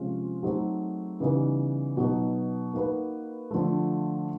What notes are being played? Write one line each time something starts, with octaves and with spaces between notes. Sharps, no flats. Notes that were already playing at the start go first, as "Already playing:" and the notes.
Already playing: C3 F3 G#3 C#4 F4
F#3 A3 C4 D#4 G#4
C#3 E3 G3 B3 D#4
B2 F#3 B3 D#4
A#3 D#4 F#4 B4
D3 F3 A3